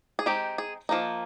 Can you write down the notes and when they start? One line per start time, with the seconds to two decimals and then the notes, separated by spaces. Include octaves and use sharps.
0.19 G#4
0.26 G#3 C4 D#4 G4
0.58 G#4
0.89 F3 A#3 D#4